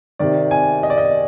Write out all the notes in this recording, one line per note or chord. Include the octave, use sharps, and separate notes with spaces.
C3 D#3 D5
G#5
D#5
D5
D#5